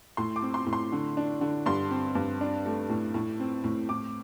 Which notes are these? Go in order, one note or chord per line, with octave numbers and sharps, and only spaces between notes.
A2 C6
D6
C4
C6
A2
C6
D3
D4
D3
G2 C6
C4
G2
D4
A3
A2
A2
C4
A2
A2 D6